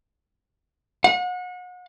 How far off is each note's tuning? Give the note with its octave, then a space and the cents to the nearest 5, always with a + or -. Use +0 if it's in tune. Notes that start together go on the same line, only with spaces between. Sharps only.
F#5 -35